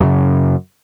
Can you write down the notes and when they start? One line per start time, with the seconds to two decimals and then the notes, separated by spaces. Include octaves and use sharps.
0.01 F#2 C#3